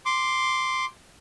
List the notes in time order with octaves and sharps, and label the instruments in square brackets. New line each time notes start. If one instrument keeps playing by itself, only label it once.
[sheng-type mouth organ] C6 D6